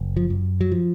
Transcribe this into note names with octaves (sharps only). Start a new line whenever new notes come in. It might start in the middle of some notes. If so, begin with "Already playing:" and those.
Already playing: F#1
F3
F#2
F#3
F3